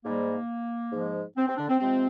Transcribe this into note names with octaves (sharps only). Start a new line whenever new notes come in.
G#2 G3 A#3
G#2 F3 G#3
C4
C4
D3 D4
C4
C3 F3 G#3 C4